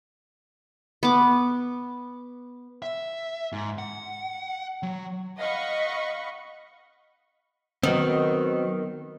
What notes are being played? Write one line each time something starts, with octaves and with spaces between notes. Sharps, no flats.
B3 D6
E5
G#2
F#5
F#3
D#5 F5 F#5 B5 C#6
D#3 F#3 B3 C4